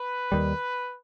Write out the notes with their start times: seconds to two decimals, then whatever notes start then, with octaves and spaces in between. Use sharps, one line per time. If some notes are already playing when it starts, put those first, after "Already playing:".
Already playing: B4
0.32 D#2 D#3 G3